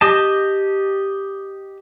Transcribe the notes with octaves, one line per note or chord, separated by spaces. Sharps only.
G4 D#5 A5